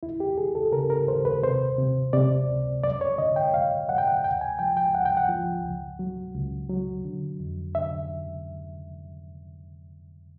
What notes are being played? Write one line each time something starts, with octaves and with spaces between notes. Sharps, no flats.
D#2 E4
G4
D#2 G#4
A4
C#3 A#4
A#4
D#2 C5
B4
C3 C5
C3
C3 D5
C#2
F#2 D5
C#5
D3 D#5
G5
F#2 F5
F#2 F#5
G5
F#5
D2 G5
G#5
F3 G5
G5
D2 F#5
G5
F#5
F3
C#2
F#3
C#2
F#3
D3
F2
D3 E5